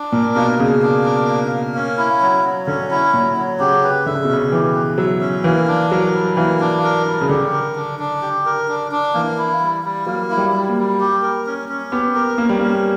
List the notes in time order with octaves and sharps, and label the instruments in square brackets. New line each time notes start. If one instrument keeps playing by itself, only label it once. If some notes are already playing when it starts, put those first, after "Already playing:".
Already playing: [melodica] D4
[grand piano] A#2 [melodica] A#4
[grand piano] B2 [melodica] A#3
[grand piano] C#3 [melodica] A#3
[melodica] D4
A#4
A#3
A#3
C#4
E4
F#3
F#3
[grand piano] D3 [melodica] C#4
[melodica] E4
[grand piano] A#2 [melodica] F#3
[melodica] F#3
[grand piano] C#3 [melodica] G4
[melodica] B4
[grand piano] D3 [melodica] E5
[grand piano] C#3
B2
[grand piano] C#3 [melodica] C#4
[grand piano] E3 [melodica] G4
[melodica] B4
[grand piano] F#3 [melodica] E5
[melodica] C#4
[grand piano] E3 [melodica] A#3
[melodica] D4
[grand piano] F#3 [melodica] A#4
[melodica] G3
[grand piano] E3 [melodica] A#3
[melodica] D4
A#4
G3
[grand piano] C#3
[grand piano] D3 [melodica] G4
[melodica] A#4
D4
D4
G4
A#4
D4
D4
[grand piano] E3 [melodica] A#3
[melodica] E4
G3
G3
[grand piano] F#3 [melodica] A#3
[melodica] E4
[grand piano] G3
[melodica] G3
[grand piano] A#3
[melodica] G3
G4
A#4
C#4
C#4
[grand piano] B3 [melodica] G4
[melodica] A#4
[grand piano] A#3 [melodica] C#4
[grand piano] G3
A#3
[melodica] C#4